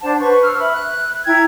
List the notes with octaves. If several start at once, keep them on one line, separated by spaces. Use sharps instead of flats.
D4 C5 F#5 A5
B4 C5 C#6
E6 F6
E5 B5
F#6
E4 G5 A#5 G#6